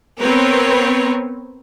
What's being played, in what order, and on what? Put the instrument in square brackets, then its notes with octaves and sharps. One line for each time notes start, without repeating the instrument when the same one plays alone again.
[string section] B3 C4 A#4 B4 C#5